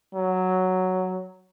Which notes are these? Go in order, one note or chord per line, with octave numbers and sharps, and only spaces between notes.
F#3